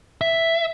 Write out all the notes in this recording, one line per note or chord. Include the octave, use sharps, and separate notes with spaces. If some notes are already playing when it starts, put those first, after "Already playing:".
E5